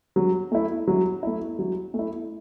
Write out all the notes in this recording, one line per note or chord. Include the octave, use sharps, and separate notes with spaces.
F#3
A3 E4
F#3
A3 E4
F#3
A3
E4